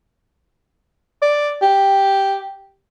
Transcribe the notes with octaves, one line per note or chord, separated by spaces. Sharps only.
D5
G4